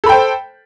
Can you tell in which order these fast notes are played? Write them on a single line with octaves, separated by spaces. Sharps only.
A4 B5 G5 C5